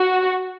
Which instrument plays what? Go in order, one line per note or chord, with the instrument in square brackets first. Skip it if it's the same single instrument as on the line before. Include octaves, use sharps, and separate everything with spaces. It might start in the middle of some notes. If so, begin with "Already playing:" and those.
Already playing: [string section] F#4